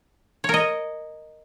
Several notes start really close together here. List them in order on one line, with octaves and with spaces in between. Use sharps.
C#5 A#4 D#5